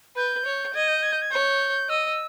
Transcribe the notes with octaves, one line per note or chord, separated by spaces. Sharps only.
B4 G6
C#5
D#5 G#6
G6
G#6
G6
G#6
C#5 G6
D#5 E6